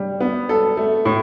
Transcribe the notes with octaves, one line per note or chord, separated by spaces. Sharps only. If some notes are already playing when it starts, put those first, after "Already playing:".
Already playing: G3
B3
A4
A3
A2